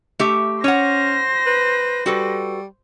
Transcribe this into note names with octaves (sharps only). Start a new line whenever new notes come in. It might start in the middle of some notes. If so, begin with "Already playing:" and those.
A3 G4 E5
C#4 C5 C#5 F#5 A#6
B4
G3 F#4 A4 B4